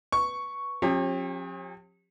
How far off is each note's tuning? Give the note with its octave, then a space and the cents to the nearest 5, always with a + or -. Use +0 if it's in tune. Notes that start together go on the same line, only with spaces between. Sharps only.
B4 +0 C#6 +0
F3 +45 C#4 -45 G4 +25